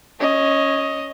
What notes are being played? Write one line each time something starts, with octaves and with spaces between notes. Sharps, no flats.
C#4 D#5